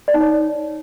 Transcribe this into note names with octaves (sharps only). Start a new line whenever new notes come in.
D5
D#4
C#5